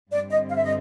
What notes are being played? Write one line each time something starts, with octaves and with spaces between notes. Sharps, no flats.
G2 D3 G3 C4 D5
D#5
F5
E5
D#5